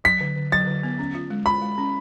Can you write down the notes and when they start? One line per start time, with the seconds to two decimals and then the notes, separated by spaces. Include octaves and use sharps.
0.04 F#3 B6
0.21 D3
0.36 D3
0.52 F#3 A6
0.67 D3
0.83 B3
0.99 C#4
1.15 F4
1.30 G#3
1.46 F4 B5
1.62 G#3
1.78 C#4